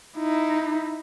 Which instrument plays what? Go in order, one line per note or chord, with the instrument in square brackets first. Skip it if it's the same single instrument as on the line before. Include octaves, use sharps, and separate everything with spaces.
[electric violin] D#4 E4